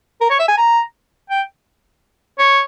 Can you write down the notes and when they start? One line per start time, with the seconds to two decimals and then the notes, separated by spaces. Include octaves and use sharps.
0.21 A#4
0.30 C#5
0.39 E5
0.48 G#5
0.57 A#5
1.30 G5
2.39 C#5